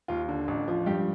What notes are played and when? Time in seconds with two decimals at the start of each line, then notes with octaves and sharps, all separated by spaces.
0.08 D#2 F4
0.29 D3
0.48 A1
0.68 F3
0.86 G2 G4